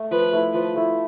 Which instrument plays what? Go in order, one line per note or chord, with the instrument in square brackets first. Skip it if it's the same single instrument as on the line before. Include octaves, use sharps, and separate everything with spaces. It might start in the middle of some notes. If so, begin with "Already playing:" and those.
Already playing: [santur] A3
[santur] F3 [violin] B4
[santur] A3 E4
[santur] F3 [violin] B4
[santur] A3 E4